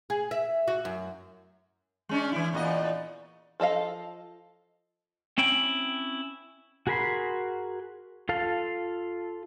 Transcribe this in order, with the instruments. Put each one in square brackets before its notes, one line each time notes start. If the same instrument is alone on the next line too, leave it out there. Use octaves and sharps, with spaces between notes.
[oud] G#4
E5
F#4
F#2
[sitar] G#3 C#4 D4
E3 E4
E2 A#2 D#5
[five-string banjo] F3 A4 D#5 F5
[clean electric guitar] C4 C#4 E4 G5
[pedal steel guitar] F#4 G#4 A#4 B5 C6
F4 A4 F5